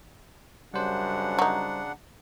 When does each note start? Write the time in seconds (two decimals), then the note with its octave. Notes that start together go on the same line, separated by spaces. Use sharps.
0.74 F#2 C#3 G3 D4 C5 F#5
1.39 F#3 D#4